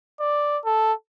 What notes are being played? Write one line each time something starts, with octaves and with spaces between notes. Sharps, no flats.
D5
A4